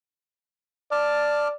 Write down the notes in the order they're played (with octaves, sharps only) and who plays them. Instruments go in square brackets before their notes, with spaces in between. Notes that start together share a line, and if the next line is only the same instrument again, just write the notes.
[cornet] D5 [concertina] A5 D6 F6